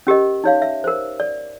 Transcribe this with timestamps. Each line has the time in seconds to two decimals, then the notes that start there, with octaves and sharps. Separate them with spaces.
0.07 C#4 G4 A#4 D#5
0.44 D#4 C#5 F5
0.62 E5
0.84 A#4 C5
1.20 D5